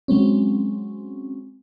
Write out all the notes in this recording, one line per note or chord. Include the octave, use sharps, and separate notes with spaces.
F#3 G#3 C4 C#4